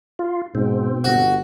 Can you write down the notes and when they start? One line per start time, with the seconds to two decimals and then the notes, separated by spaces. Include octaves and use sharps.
0.19 F4
0.55 G#2 B2 C4
1.04 G1 F#4